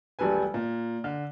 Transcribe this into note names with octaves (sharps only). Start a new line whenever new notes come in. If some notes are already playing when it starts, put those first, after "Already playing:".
E1 A#1 G3 A4 B4 G#5
A#2
D3